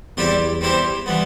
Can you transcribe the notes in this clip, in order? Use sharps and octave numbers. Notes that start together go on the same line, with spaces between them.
E2 G3 C4 E4 G4 D5
G3 C4 E4 G4 C5
E3 G3 B3